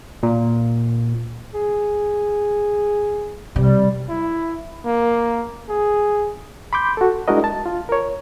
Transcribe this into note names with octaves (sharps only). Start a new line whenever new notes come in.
A#2
G#4
C3 G3
E4
A#3
G#4
B5 C6 D6 G6
F#4 A4
G#3 D4 E4 F#4 A#4 D#5
A5
F4
A#4 C#5